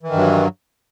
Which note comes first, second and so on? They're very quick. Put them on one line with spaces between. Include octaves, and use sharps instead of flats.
E3 D#3 G2 F#3